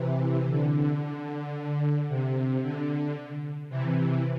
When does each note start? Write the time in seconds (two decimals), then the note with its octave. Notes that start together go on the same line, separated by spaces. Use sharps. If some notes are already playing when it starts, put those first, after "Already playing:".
Already playing: C3 E3
0.47 D3
2.09 C3
2.63 D3
3.70 C3 E3